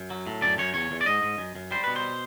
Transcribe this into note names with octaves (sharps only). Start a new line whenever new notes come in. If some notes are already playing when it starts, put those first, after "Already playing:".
Already playing: F#2
F#3
A2
F#2 D5
F#2 C#5
E2 C#5
E2
D5
G#2 D#5
G#2
F#2
F#2
G3 C5
B2 B4
C5